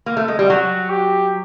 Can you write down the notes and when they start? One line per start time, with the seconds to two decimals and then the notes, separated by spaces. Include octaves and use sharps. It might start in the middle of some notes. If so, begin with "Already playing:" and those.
0.06 A#3
0.17 A3
0.28 G#3
0.39 G3
0.50 F#3 F#4
0.90 G4